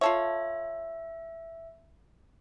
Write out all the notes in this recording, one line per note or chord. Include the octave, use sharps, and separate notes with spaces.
F4 A4 C#5 E5